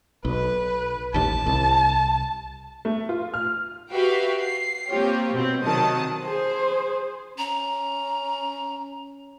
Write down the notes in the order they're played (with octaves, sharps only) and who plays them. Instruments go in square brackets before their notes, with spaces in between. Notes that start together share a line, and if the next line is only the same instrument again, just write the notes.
[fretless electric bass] B1 [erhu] B4
[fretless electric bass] A1 D#2 [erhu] A5
[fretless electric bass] C2
[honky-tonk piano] A3
F4
F6
[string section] F#4 G4 B4 E5 F5 G5
C7
A#3 C4 F4 G4 C#5
B2 C4
C3 D#3 F#3 A5 D#6
[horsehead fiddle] G#4 C5
[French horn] C#4 [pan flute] A#5